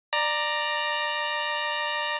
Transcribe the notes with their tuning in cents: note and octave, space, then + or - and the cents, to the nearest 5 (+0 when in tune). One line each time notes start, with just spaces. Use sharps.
D5 +15 A#5 +0